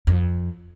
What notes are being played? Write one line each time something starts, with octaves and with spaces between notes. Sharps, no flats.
F2